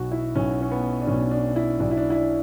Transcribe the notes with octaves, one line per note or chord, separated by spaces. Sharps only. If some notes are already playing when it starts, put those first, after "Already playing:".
Already playing: B1 B2 F#4
E4
B1 B2 C#4
C#4
B3
D4
B1 B2 C#4
D4
E4
B1 B2 D4
E4
D4
E4
D4